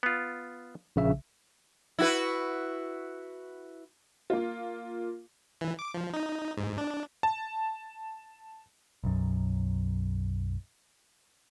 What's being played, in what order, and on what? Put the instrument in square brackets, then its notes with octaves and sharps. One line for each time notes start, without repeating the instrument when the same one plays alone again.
[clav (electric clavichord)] B3 F4
[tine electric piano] A#1 C#3 E5
[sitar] E4 F#4 B4
[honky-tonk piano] A#3 F4
[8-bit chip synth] E3
D6
F3
D#4
G#2
D4
[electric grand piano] A5
[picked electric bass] B1 F#2